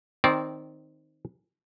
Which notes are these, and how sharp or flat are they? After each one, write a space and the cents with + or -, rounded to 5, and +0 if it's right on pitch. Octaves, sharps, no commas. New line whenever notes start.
D#3 +0 C4 +0 D5 -25